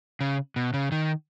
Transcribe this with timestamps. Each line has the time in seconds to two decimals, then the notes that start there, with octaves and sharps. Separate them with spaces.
0.21 C#3
0.56 B2
0.74 C#3
0.92 D#3